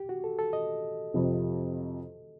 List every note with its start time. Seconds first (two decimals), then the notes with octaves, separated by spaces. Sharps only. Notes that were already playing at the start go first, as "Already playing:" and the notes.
Already playing: G4
0.09 F#4
0.24 A4
0.39 A4
0.53 D#5
1.14 F2 C3 F3